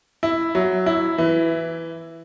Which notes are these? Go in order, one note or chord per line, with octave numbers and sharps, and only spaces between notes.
E4
F#3
E4
E3